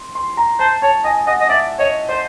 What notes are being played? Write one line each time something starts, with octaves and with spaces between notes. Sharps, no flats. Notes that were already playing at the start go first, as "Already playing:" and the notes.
Already playing: C6
C6
A#5
C5 A5
C#5 A5
D#5 G#5
D#5 F#5
D#5
D5 E5
C#5 D#5
C5 D5